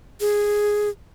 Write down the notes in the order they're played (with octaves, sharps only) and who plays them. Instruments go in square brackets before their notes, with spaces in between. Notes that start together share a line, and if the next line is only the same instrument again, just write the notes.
[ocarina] G#4